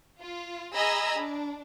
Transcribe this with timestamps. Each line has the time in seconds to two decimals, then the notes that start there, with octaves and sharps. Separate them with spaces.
0.20 F4
0.74 G#4 D#5 G#5 A#5 B5 E6
1.16 D4